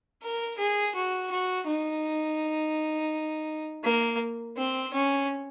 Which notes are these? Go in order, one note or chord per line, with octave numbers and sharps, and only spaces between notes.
A#4
G#4
F#4
F#4
D#4
A#3
C4
C#4